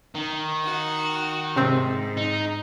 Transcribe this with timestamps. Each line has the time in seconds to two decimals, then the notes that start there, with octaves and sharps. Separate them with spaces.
0.15 D#3
0.63 F#4
1.56 G#2 C3 C4
2.17 D#4